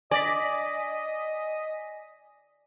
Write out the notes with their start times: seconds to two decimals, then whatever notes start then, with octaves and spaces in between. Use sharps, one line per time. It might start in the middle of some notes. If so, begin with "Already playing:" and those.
0.11 D5 D#5 G#5 A#6 B6